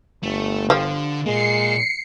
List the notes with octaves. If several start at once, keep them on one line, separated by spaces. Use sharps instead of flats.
G1 A3
D3 F3 G3
A#2 G#3 A#3 C7 C#7